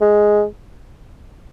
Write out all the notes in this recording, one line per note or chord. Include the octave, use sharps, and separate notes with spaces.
G#3